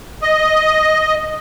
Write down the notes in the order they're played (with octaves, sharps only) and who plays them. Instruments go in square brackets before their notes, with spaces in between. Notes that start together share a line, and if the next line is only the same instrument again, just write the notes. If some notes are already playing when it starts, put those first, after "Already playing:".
[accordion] D#5